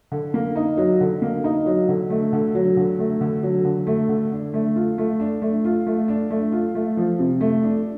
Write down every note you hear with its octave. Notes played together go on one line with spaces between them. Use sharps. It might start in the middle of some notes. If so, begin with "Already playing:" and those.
D3
A#3
D#4
F#3
D3
A#3
D#4
F#3
D3
A3
D3
F#3
D3
A3
D3
F#3
D3
A3
D3
D4
A3
F4
A3
D4
A3
F4
A3
D4
A3
F4
A3
F3
C3
A3
D4